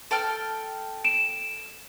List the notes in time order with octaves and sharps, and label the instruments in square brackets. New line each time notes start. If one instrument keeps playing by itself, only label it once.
[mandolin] A4 G5 F6
[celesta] D7 E7